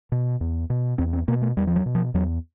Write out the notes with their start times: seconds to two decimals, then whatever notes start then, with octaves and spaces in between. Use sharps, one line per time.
0.12 B2
0.41 E2
0.70 B2
0.98 E2 C4
1.13 C4
1.28 B2 A#3
1.42 A3
1.57 E2 G3
1.67 F3
1.76 F#3
1.86 B2
1.95 F3
2.14 E2 F#3